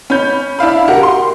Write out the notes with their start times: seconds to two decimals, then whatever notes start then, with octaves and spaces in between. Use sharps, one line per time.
0.10 C#4 B5 G6
0.59 D4 E4 F5 B5
0.88 F#4 G4 A#4 F#5
1.03 C6